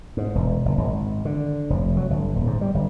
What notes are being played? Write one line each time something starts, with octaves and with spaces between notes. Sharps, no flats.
G#2
E1
F#1
G#1
D3
F1
F#3
G1
D#1
G#2
G3
G1